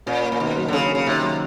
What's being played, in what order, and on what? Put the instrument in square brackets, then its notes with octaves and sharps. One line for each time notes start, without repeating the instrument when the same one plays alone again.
[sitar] A#2 [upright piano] C#4
[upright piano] A#3
[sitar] A#2
[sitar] B2 [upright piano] D#3
[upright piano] F#3
[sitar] D3
[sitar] C#3 [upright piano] C#4
[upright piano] A#3
[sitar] C#3
[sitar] C3 [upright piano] D#3
[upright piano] F#3